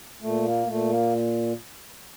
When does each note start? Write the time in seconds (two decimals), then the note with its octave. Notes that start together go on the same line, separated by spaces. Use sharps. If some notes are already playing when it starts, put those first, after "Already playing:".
0.21 A#2 A3
0.44 A#3
0.67 A#2 A3
0.90 A#3